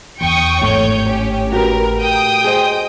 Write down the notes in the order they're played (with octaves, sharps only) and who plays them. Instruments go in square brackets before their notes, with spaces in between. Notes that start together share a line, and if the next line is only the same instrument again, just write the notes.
[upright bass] E2 [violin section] G5 C#6 D#6
[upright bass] G#1 [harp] A2 A4 C#6 [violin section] C#5 G6
[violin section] C#4 G4
[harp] F#4 G4 B4 [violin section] A#4
[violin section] G5 D#6 G6
[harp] G#4 C5 D#5